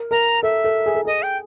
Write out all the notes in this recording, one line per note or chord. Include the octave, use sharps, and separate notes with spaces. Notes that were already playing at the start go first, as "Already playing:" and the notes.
Already playing: A#4
A#4 A#5
A4 E5
A4
G#4
A4
G#4 D#5
G5